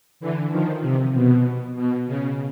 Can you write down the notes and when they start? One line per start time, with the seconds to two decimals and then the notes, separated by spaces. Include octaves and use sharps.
0.20 D3 E3
0.51 D#3 F3
0.82 C3
1.13 B2
1.76 B2
2.07 C#3